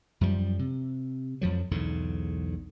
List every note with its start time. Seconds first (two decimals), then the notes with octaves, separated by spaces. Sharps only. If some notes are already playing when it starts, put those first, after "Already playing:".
0.21 F#2 F3 G3
0.59 C3
1.41 F2 F3 F#3
1.71 B1 E2 G#2 D3